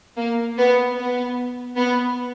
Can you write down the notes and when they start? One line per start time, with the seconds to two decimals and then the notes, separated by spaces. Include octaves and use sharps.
0.17 A#3
0.58 B3
0.97 B3
1.76 B3